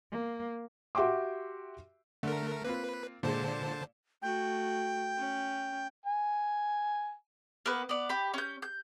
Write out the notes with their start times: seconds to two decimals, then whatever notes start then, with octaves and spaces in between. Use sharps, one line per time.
0.11 A#3
0.95 F#4 G4 E5 G5 C6 D6
2.23 D3 A3 A#4
2.64 A#3 C4 F4 B4
3.23 A#2 D3 G#3 C5 A5
4.22 A3 F#4 G5
5.18 C#4
6.06 G#5
7.66 A#3 B3 B4
7.89 B3 D5
8.09 G4 B5
8.34 C#4 G6
8.62 G6